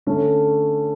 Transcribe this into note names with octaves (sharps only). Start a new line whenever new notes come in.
D3 A3 C#4